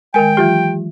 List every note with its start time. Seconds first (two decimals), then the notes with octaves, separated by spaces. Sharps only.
0.14 D#3 G#3 A#4 G5 G#5
0.37 E3 F#3 F4 G4